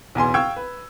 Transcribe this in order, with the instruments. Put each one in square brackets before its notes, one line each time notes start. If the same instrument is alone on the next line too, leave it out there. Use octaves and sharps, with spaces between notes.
[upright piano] B1 E2 G#5 C6
F5 G5 C#6 E6 G#6
B4